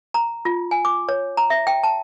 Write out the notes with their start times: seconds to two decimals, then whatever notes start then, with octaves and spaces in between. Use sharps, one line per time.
0.14 A#5
0.45 F4
0.71 G#5
0.85 D6
1.09 C#5
1.37 A#5
1.50 E5
1.67 G5
1.83 A5